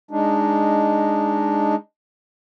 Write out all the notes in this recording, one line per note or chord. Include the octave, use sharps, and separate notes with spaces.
G#3 D4 D#4